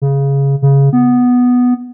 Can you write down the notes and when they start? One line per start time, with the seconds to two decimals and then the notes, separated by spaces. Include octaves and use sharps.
0.02 C#3
0.62 C#3
0.93 B3